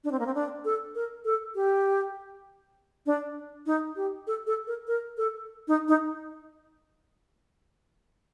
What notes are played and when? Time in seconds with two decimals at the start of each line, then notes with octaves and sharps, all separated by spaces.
0.04 D4
0.12 C4
0.19 A#3
0.26 C4
0.35 D4
0.65 A4
0.95 A#4
1.25 A4
1.55 G4
3.06 D4
3.66 D#4
3.96 G4
4.27 A4
4.47 A4
4.67 A#4
4.87 A#4
5.17 A4
5.68 D#4
5.88 D#4